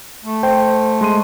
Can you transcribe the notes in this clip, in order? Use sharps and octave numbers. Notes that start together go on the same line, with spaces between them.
A3
C5 G5
G#3 C6 D#7